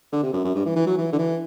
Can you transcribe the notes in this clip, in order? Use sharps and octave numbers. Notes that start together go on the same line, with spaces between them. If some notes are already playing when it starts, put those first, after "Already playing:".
D3
C3
F#2
F#2
G2
E3
E3
F#3
E3
D3
E3